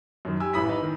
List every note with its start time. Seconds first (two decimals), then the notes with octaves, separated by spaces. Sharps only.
0.25 F#2 D#3
0.40 G4 G#5 E6
0.53 A1 E3 B5 D#6 B6
0.69 D#4 B4
0.82 D#3